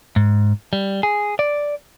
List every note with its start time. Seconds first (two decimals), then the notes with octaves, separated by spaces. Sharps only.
0.16 G#2
0.73 G3
1.03 G#4
1.39 D5